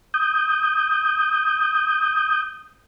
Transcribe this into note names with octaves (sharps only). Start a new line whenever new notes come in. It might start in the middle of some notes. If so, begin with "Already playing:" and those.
D#6 G6